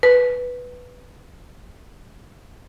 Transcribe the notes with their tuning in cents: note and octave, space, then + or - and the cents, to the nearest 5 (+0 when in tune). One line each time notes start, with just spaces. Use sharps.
B4 +0